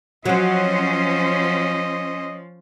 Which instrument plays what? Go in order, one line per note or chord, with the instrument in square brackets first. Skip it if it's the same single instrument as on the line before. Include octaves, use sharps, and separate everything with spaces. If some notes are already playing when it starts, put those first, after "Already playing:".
[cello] F3 [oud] F#3 C4 [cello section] C#4 C5 [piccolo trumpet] D#5